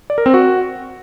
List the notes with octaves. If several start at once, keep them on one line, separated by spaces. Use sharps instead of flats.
D5
A#4
C4
F#4